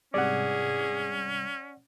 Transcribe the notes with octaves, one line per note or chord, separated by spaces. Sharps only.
G#2 C3 G3 C#4 G#4 D5 F#5